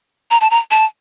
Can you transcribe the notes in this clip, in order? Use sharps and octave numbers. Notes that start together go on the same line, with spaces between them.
A#5
A5
A#5
A5